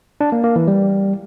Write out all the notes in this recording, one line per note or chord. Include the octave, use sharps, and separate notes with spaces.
D4
A#3
A#3
E3
G3